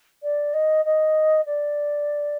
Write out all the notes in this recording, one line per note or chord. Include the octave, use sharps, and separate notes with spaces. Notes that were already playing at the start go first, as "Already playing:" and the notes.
D5
D#5
D#5
D5